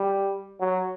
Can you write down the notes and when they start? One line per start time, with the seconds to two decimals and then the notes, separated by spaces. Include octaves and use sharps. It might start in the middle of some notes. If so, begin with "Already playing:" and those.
Already playing: G3
0.60 F#3